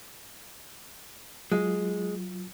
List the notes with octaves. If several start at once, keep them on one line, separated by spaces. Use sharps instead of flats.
F#3 G#3 F4